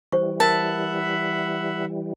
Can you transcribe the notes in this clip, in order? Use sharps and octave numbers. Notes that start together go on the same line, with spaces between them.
E3 G3 C5 C#6
A#4 E5 F#5 A5 B5 E6